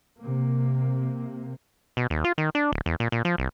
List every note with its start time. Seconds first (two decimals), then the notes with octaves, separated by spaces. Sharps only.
0.20 C3 A#3
1.97 B2
2.10 D#2
2.24 F4
2.38 D#3
2.55 D4
2.72 D1
2.86 E2
3.00 A#2
3.12 A#2
3.25 F3
3.38 C2